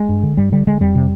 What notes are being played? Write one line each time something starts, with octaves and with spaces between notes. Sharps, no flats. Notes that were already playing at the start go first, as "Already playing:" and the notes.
Already playing: G#3
G2
D3
G2 G3
D3 G3
D3 G#3
F2 G3
C3